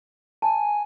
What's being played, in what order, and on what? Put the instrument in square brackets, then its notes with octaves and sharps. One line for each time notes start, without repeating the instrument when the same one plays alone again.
[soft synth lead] G#5 [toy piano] A5